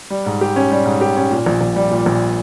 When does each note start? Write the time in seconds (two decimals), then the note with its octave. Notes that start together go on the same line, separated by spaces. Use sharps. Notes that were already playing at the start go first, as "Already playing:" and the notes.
0.10 G3
0.26 G#2
0.41 G4
0.56 C#4
0.72 G3
0.85 G#2
1.01 G4
1.16 C#4
1.31 A#2
1.46 A#1
1.61 A#1
1.76 G3
1.91 A#2
2.06 A#1